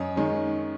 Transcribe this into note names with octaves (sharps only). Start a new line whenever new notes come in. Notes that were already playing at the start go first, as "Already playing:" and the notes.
Already playing: F#2 C#5 D#5
D#3 G#3 C#4